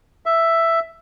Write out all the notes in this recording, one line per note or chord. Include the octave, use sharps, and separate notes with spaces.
E5